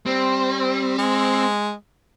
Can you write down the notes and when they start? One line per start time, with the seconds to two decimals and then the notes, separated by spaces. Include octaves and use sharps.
0.06 G3 C4
0.98 G#3